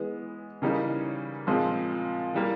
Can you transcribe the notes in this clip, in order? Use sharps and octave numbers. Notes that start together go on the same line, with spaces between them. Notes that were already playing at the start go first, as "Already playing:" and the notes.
Already playing: E3 G#3 B3
C#3 E3 G3 A#3 D#4
A#2 F3 G#3 C4
E3 G3 A#3